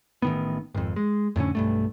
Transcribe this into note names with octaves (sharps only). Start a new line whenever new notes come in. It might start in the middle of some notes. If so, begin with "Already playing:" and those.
A1 D#3 B3
G#1 F2
G#3
F2 A2 D3 C#4
B1 G2 A3